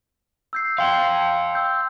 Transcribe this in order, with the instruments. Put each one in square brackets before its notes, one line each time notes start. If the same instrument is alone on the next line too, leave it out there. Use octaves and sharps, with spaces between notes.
[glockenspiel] E6 G6 C7
[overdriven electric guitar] F5 G5 [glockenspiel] C6
[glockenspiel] E6 G6